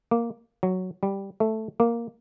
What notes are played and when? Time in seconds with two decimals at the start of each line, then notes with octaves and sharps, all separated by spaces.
0.11 A#3
0.63 F#3
1.03 G3
1.40 A3
1.80 A#3